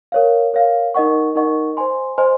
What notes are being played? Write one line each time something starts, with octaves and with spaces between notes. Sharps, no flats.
A#4 C#5 F5
A#4 C#5 F5
D#4 A#4 D#5 F#5 C#6
D#4 A#4 D#5 F#5 C#6
C5 D#5 G#5 C6
C5 D#5 G#5 C6